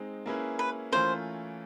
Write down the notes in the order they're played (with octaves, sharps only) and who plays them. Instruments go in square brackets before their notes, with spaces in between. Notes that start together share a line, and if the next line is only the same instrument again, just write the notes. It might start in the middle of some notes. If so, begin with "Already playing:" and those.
Already playing: [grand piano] G#3 C4 D#4
A#3 C#4 E4 G#4 B4
[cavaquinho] B4
[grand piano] E3 A3 C#4 F4 A#4 [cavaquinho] C5